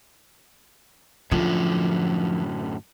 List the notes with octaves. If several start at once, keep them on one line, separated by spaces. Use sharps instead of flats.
F#2 A2 D3 F3